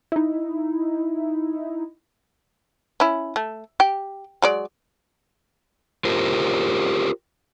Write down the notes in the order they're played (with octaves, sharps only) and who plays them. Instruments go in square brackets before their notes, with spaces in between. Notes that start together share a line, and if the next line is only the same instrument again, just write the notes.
[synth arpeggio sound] D#4 E4
[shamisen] C#4 E4
A3
G4
F#3 G#3 D5
[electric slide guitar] F4 G4 A#4 C5